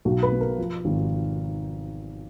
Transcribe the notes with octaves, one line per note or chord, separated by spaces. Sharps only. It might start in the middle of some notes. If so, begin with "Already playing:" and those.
B1 F#4
B4
B2
A#4
F3
G#1